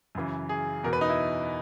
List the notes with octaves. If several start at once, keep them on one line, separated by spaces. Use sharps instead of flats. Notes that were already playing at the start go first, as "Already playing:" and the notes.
F#2 C#3 E3
G#4
E2 B2 A#4
B4
D#4
E4